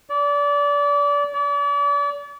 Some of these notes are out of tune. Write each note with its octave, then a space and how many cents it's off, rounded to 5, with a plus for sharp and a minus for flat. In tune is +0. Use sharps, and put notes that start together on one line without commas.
D5 -30
D5 -40